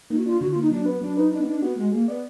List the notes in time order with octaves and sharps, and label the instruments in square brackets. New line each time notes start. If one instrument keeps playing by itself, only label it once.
[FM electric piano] A#3 [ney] D#4
[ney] F#4
[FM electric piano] D4 [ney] F4
[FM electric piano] D3 [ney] F#4
[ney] F4
[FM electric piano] A#3
[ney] D#4
[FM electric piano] F#3 [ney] D4
[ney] B3 [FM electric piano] B4
[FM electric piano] F#3 [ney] D4
[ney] D#4 [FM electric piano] B4
[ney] D4 [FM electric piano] D#4
[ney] B3
[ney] D4 [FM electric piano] D#4
[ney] B3 [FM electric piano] F#4
[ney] G#3 [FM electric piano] F#4
[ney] A#3 [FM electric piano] G#4
[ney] B3 [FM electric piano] D5